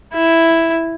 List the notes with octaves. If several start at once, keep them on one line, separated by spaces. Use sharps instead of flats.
E4